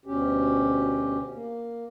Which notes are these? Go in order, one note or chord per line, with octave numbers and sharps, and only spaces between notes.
D2 B2 C#4 G4
A#3